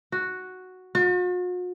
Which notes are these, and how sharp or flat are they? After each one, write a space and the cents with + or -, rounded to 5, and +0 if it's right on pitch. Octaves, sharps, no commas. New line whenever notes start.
F#4 +0
F#4 -45